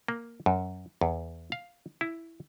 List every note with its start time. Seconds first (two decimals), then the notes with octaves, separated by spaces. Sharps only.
0.08 A#3
0.46 F#2
1.01 E2
1.52 F5
2.01 E4